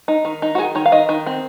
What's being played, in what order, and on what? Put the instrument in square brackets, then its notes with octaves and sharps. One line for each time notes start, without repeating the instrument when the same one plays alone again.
[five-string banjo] D#4
D#3
D#4
F#4
D#3 G#4
D#3 C#5
F5
D#3 D#5
D#3
C4